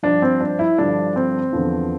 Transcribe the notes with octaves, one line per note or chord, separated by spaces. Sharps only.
G2 F3 D4
C4
D4
E4
G2 D3 F3 D4
C4
E2 D3 F3